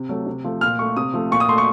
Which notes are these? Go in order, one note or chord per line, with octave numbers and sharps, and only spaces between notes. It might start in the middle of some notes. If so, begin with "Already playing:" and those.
Already playing: C3
F#3 A3
C3
F3 A3
A#2 F6
A3 C#6
C3 D#6
F3 A3
A#2 C#6
D#6
A3 C6
C#6